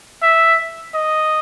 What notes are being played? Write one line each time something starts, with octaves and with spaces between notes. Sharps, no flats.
E5
D#5